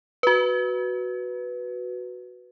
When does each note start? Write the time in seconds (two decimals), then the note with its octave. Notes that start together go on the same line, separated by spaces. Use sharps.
0.23 F#4 B4